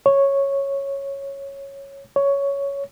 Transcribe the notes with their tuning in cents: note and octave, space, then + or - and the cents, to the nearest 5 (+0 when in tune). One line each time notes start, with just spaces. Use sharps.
C#5 -5
C#5 +10